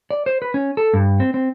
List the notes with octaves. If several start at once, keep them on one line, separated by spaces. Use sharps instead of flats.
D5
C5
B4
C#4
A4
G2
C4
C4